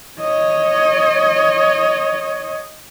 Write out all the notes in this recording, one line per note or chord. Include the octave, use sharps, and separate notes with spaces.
C#5 D#5